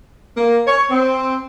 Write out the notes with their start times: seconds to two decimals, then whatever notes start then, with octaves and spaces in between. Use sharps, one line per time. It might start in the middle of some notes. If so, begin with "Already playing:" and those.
0.37 A#3
0.67 C#5
0.90 C4